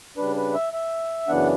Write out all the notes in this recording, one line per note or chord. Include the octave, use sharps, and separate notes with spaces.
C#3 G3 D4 B4
B4
E5
E5
F#2 C#3 E3 B3 D4 F#5